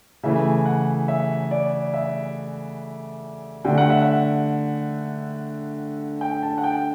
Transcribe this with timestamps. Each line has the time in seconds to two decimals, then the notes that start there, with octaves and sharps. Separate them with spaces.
0.23 C#3 E3 A3 E5
0.65 F#5
1.08 E5
1.51 D5
1.94 E5
3.65 D3 A3 G5
3.78 F#5
3.90 E5
4.02 F#5
6.21 G5
6.43 A5
6.58 F#5
6.64 G5